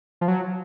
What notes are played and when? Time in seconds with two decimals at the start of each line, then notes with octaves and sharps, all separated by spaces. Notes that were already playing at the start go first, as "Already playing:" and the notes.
0.21 F3
0.28 F#3